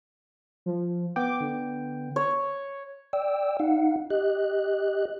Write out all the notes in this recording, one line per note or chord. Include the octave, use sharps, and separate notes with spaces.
F3
B3 G5 D6
D3
C#5
D5 G5 E6
D#4 F5 F#5
G4 D#5 F#6